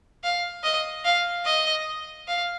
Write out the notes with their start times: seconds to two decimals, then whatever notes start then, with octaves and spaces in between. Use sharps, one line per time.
0.24 F5
0.64 D#5
1.05 F5
1.46 D#5
2.28 F5